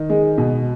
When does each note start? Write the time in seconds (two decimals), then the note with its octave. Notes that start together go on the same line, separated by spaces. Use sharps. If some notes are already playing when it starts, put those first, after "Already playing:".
Already playing: D#3
0.10 G#3
0.38 B2